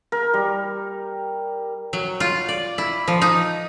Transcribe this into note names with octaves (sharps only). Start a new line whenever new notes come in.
A#4
G3
F#3
F4
D5
E4
F3
D#4